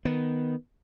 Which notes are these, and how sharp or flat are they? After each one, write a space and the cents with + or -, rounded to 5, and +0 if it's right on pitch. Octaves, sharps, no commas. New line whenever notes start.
D#3 +0 B3 +0